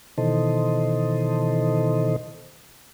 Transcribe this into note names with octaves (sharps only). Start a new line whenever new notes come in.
B2 D#3 E3 A4 C5 D#5